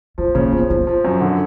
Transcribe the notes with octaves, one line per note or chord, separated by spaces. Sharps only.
F3 A3
C#3 A#3
F3 B3
F3 C4
F3
F#2
D3